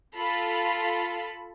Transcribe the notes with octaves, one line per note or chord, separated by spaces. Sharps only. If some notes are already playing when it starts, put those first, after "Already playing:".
F4 A4 B5